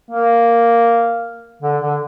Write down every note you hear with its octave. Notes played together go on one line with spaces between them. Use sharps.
A#3
D3
D3